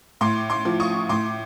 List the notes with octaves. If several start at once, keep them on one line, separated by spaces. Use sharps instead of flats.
A2 C6 D6
C6 D6
F3
C#6 D#6
A2 C6 D6